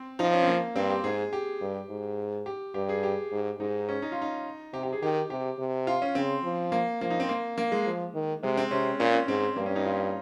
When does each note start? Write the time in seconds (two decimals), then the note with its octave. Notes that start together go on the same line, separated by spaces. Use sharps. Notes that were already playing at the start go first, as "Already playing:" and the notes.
Already playing: C4
0.19 F3 D#4
0.34 C#4
0.43 C4
0.48 A#3
0.75 G2 C4
0.90 G4
1.04 G#2 G#4
1.33 G4
1.61 G2
1.89 G#2
2.46 G4
2.74 G2 G4
2.89 G#4
3.03 G4
3.32 G#2
3.60 G#2 D#4
3.89 C#4
4.02 D#4
4.12 F4
4.22 D#4
4.73 C3 G4
4.83 G4
4.93 G#4
5.02 D#3 G4
5.30 C3 G4
5.59 C3
5.87 F4
6.02 C#4
6.15 C#3 C4
6.43 F3
6.72 A#3
7.01 F3 A#3
7.10 D#4
7.20 C4
7.29 A#3
7.58 A#3
7.72 G#3
7.86 F3
8.14 D#3
8.43 C3 G#3
8.57 C4
8.71 C3 C#4
9.00 A#2 C#4
9.14 C4
9.28 G#2 C4
9.56 G2 A#3
9.66 C#4
9.76 D#4
9.85 F4